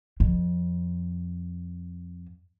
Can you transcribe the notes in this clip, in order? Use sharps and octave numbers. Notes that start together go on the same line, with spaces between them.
F2